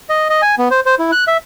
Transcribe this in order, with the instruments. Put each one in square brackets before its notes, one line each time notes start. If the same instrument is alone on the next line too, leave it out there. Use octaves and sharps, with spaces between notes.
[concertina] D#5
D#5
G#5
B3
C5
C5
E4
F#6
E5